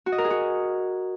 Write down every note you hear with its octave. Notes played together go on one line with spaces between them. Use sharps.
F#4
D#5
A#4
G#4
F#4